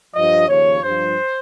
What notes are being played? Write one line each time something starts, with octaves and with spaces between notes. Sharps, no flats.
G2 F3 D#5
D#2 C#3 F3 C#5
G2 F3 C5